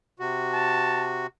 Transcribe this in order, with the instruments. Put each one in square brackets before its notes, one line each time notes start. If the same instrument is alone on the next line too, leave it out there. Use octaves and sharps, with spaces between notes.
[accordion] C3 F#4
[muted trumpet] A5